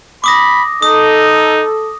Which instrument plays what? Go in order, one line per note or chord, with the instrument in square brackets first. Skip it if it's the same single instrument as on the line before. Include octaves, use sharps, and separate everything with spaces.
[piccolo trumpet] B5 [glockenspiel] D6 D#6 A#6
[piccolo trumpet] D#4 [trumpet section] A4 [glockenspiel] D#6